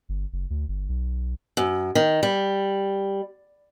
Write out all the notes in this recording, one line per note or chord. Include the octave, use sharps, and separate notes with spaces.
G1
F#1
D2
G1
B1
F#2
D#3
G3